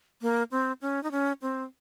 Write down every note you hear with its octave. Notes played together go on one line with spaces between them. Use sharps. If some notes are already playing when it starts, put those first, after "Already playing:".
A#3
C4
C#4
D#4
C#4
C4